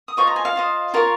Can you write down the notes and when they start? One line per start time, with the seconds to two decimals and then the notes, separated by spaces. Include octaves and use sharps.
0.08 D#6
0.17 F4 C5 D#5 C#6
0.27 A#5
0.36 G#5
0.45 F5
0.56 F4 C5 D#5
0.94 F4 A#4 C#5